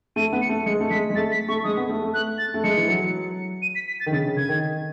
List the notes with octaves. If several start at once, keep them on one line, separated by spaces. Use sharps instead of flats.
A3 D#7
B3
C#7
A3
G#3 C#7
A3
G#3 B6
G#3
A3 A6
B6
A3 C#6
G#3 D#6
B3
A3
A3
F#6
A6
A3
G#3 C#7
E3
F#3
D#7
B6
B6
A6
D#3
C#3 A6
C#3
C#3 G#6
D#3